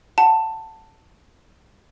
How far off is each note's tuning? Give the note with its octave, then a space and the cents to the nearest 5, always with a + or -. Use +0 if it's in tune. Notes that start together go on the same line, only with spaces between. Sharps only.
F#5 +0 A5 +10